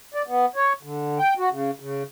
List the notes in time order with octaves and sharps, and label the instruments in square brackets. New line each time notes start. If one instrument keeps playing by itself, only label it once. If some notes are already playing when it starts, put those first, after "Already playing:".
[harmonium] D5
B3
C#5
D3
G5
F#4
C#3
C#3